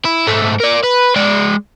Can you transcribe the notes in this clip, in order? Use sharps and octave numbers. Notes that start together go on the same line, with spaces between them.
E4
G#2 A3
A#4 D5
B4
G#3 D5